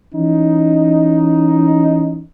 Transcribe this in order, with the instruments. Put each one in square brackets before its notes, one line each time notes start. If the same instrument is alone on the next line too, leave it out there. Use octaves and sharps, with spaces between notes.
[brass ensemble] E3 C#4 D#4